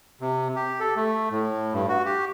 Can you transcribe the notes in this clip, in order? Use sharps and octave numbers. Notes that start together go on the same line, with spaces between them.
C3
G4
A4
A3
A2
G2
F#4
G4